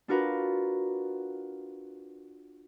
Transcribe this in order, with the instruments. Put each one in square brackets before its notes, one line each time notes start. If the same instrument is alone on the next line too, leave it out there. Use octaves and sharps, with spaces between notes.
[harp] D4 F4 F#4 A#4 B4